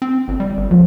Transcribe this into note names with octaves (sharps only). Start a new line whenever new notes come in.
C4
G1
G3
G1
C#2 F3